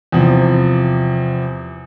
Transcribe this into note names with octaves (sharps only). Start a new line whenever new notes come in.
E2 C3 F3